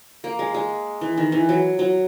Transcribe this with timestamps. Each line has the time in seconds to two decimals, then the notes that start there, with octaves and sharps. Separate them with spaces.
0.24 A#3
0.39 G#3
0.54 G#3
1.01 E3
1.17 D#3
1.32 E3
1.49 F#3
1.79 F#3